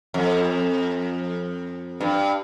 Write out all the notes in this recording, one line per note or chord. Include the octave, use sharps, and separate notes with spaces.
F2
G2